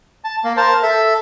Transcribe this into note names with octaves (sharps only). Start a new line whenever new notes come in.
A5
A#3
A#4 C5 A5
A4 E5